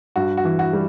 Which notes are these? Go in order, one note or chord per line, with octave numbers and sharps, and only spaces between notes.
G2 F#4
F#4
E3
F#4
G3